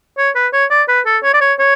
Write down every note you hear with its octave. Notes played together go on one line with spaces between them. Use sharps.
C#5
B4
C#5
D5
B4
A4
C#5
D5
C#5
C#5